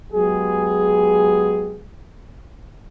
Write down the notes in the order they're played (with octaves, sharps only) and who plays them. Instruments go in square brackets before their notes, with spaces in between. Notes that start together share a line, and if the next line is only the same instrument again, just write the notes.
[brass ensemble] F#3 G#3 B3 G4 G#4